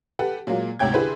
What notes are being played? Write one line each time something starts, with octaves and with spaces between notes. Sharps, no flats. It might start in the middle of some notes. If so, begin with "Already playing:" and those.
G4 A4 B4 F#5
A#2 F#3 G#3 A#3
D2 G#2 C3 C#5 G5 G#6
D3 E4 G4 G#4 B4 C5